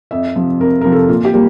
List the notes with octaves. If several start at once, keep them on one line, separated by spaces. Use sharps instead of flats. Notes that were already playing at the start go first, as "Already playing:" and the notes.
F2 E5
C3 F3
F2 A#4
C3 F3 A#4
A4
A#2 F4
G4
G3 A#3